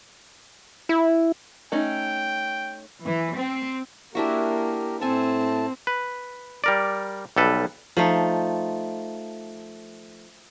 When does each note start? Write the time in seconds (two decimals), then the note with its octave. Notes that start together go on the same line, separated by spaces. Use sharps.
0.89 E4
1.72 A3 C#4 D#4 G5
3.05 E3
3.36 C4
4.15 A#3 D4 E4 F#4 G4 A#4
5.01 A2 C4 A4 G#5 A5
5.87 B4
6.64 G3 A#4 D5
7.36 B1 G3 A4 B4
7.97 F3 A3 D#4